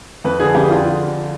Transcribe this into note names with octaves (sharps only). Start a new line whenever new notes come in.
F2 B4
D3 G#4
F2 G4
D3 F4